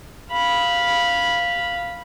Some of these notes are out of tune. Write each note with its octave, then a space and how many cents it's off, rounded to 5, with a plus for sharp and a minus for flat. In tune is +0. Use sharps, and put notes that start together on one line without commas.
F5 +0 B5 -10